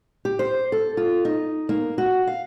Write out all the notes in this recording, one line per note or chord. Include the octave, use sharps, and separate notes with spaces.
G4
C5
A4
F4
D#4
A#3
F#4
F5